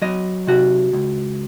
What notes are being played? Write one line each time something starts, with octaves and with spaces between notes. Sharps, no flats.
F#3 D#5
C3 F#4
C#2